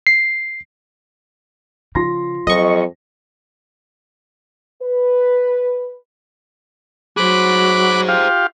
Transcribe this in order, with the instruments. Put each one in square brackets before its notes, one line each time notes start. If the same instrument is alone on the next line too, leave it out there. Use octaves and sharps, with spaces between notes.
[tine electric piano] C7
[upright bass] C#3 [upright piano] F3 C6 A#6
[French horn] F2 [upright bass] F#3 [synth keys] D#5 C#6
[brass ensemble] B4
[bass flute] F#3 [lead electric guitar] G#4 C5 [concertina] B5 D6 F#6
[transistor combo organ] F4 G4 F5